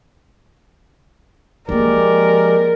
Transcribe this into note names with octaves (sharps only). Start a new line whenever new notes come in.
F3 G#3 A#3 G4 A#4 D5